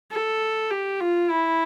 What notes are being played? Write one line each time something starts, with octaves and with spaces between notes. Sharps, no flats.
A4
G4
F4
E4